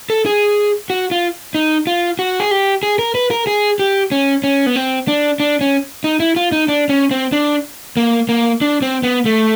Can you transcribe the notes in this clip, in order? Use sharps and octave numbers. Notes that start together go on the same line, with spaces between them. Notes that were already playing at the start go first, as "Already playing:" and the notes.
A4
G#4
F#4
F4
D#4
F4
F#4
G#4
G4
G#4
A#4
B4
A#4
G#4
G4
C#4
C#4
B3
C4
D4
D4
C#4
D#4
E4
F4
D#4
D4
C#4
C4
D4
A#3
A#3
D4
C4
B3
A3